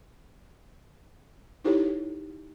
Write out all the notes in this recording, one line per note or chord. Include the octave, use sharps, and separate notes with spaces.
D#4 E4 G4 A4 C#5